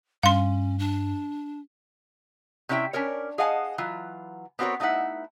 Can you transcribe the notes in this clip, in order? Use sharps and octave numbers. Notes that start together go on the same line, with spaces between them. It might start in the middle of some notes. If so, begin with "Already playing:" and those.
G2 C#4 F5 C6
D4
C3 C#4 E4 E5 G5
C#4 D4 A#4 C#5
G#4 D#5 F5 F#5 G#5 A5
E3 F#3 F4
B3 C4 F#4 A#4 C#5
A3 D#4 E4 E5 F#5